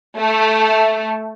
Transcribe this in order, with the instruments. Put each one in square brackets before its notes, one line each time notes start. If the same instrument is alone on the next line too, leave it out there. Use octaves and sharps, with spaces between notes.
[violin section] A3